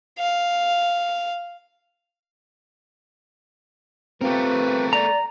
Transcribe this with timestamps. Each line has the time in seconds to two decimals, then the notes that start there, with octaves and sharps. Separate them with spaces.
0.19 F5
4.21 A3 C4 F4 G4 A#4 B4
4.93 D5 A#5